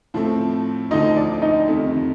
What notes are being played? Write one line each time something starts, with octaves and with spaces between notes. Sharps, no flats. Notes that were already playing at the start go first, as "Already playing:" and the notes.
A2 F3 A3 C4
D2 D3 F3 D#4 D#5
D5
D#4 D#5
F2 C3 D#3 A3